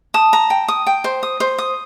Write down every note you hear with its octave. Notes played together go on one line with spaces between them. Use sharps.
A5 D#6
A#5
G5
D#6
G5
C5
D#6
C5
D#6